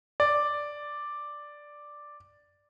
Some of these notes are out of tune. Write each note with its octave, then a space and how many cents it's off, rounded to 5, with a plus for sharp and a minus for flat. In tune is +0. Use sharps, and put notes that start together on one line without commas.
D5 +0